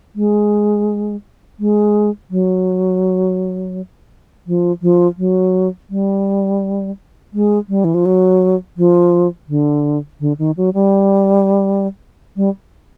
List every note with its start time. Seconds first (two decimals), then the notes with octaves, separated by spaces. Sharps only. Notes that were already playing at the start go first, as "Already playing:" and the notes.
0.15 G#3
1.59 G#3
2.30 F#3
4.47 F3
4.82 F3
5.18 F#3
5.90 G3
7.33 G#3
7.69 G3
7.84 E3
7.94 F3
8.05 F#3
8.77 F3
9.48 D3
10.20 D3
10.38 D#3
10.57 F#3
10.74 G3
12.36 G3